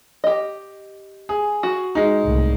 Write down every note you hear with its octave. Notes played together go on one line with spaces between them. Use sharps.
G4 D#5
G#4
F#4
G#3 D#4
C2 A2